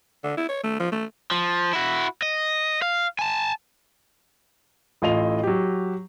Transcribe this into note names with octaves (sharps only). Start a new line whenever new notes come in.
D3
E4
C#5
A3
F3
A3
F3
E4 F#4
D#5
F5
G#5 A5
A1 A2 F4 D#5 F7
F#3 G4